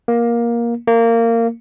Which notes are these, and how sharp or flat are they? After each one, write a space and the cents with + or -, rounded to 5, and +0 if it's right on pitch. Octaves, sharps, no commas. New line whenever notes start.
A#3 +15
A#3 -20